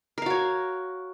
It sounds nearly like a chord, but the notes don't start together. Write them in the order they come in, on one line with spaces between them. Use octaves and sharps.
A#4 F5 F#4 C#5